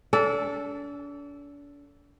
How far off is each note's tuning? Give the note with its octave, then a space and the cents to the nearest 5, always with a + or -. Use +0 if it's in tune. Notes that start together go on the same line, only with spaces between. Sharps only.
D4 -40 A4 +0